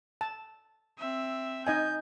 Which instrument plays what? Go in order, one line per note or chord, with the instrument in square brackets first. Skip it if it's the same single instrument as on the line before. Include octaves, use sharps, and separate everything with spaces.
[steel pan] A5
[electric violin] C4 E5
[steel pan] D#4 D#5 G#5 [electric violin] G6